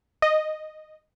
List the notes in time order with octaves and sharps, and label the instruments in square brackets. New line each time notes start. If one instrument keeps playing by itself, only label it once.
[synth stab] D#5